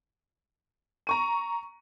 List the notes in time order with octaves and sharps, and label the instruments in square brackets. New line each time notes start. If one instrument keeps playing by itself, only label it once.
[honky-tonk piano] A#5 C#6 D#7